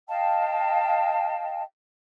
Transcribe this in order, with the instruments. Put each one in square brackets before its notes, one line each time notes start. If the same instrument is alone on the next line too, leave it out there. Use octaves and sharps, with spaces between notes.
[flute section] D#5 F5 G5 A5